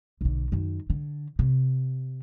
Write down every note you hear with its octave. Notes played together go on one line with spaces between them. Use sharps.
B1 D3
F#2 D#3
D3
C3